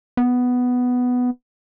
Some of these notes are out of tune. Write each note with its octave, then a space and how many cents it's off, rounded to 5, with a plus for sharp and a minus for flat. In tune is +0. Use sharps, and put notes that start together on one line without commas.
B3 +5